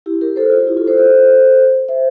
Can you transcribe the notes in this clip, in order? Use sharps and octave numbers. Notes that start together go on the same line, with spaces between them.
E4 G4
G4 A#4
A4 C5
F4
E4 G4
F4 A4
A4 C5
A4 C5
C5 E5